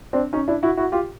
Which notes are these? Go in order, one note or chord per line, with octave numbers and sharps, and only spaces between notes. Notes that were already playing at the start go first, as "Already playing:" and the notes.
C4 D4
C#4 D#4
D4 E4
E4 F#4
E4 F#4
F4 G4